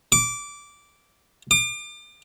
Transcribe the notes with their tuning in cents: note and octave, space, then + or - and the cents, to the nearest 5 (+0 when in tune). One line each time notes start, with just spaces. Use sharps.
D6 -10
D6 +35